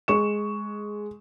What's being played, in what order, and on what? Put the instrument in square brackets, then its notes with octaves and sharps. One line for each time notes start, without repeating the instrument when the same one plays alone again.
[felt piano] G#3 C#6 E7